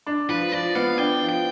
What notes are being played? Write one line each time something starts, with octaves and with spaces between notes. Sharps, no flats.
D4
F3 B4
F3 D5
B3 F5
D4 G5
F3
G5